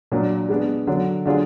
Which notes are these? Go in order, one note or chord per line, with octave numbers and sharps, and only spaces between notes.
A#2 F#3 D4
G#3 B3 D4
D3 F#3 D4
D3 F#3 D4 F4 G#4